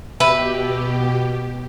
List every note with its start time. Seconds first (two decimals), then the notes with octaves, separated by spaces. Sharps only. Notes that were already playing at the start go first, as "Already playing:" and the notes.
0.20 B2 G4 B4 E5